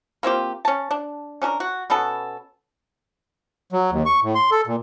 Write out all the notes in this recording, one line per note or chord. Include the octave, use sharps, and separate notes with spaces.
A#3 C4 F4 G4
C#4 A5
D4
C#4 D4 F#4 A#4
F#4
B2 B3 C#4 A4
F#3
D#2
C#6
A2
C6
A4
A#2